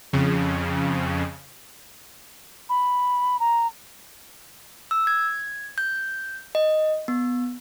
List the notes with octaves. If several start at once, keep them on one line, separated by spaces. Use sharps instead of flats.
F2 C#3
B5
A#5
E6
G#6
G6
D#5
B3